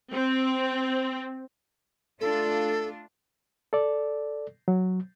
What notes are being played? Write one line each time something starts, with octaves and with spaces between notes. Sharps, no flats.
C4
A3 D4 F4 A4
A4 D5
F#3